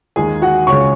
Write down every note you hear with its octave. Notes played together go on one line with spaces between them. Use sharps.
D#2 D#3 G#3 G#4 G#5
F#4 F#5
C#2 C#3 G#3 C#5 C#6